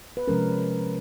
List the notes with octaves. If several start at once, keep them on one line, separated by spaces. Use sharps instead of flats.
B4
C3 F3 G#3 C#4 A#4